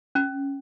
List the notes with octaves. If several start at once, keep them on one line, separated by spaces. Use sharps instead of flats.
C#4